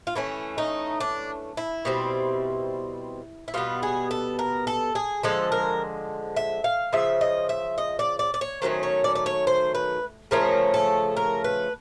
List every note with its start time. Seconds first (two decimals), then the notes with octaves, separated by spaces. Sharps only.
0.07 F4
0.15 E3 A3 C#4 E4
0.58 D#4
1.00 D4
1.57 E4
1.85 B2 G3 C4
3.48 E4
3.54 B2 G3 B3 F4
3.83 G#4
4.11 A4
4.39 A#4
4.67 A4
4.95 G#4
5.23 D3 F3 G#3 A4
5.52 A#4
6.36 E5
6.64 F5
6.93 C#3 F3 E5
7.21 D#5
7.49 E5
7.78 D#5
7.99 D5
8.19 D5
8.34 D5
8.41 C#5
8.62 D#3 F#3 A3 C#4 C5
8.83 C#5
9.04 D5
9.15 D5
9.26 C#5
9.47 C5
9.75 B4
10.31 C#3 F3 A3 C#4 A#4
10.74 A4
11.17 A#4
11.44 B4